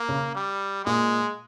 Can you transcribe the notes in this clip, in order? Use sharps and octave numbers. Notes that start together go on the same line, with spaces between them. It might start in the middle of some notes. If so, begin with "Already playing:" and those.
Already playing: A#3
C#3
G3
A#2 G#3